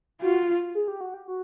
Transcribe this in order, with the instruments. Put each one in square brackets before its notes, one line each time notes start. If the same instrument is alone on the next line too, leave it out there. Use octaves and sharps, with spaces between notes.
[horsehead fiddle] F4 [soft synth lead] F#4
[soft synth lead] G#4
G4
F#4
G4
F#4